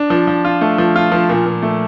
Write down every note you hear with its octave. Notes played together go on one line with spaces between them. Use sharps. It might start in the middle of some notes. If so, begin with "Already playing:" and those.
Already playing: D4
F3
F3
F4
A3
F3
F4
F3
A#2
A#2
A3